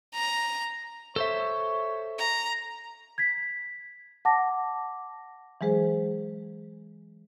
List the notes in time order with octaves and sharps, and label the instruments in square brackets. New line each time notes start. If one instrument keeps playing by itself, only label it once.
[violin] A#5
[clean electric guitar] A4 C5 E5 [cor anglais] C#5
[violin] A#5
[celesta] G#6 B6
F#5 A5 D6 A#6
[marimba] E3 F#3 G#3 G#4 C5